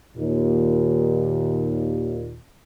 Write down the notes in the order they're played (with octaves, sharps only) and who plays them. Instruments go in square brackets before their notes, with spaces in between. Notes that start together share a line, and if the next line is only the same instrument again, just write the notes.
[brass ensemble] D#2 A#2